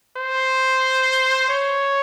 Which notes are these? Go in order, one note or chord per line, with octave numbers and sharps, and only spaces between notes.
C5
C#5